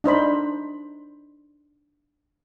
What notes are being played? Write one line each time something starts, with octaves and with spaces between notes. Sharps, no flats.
D4 D#4 C5 B5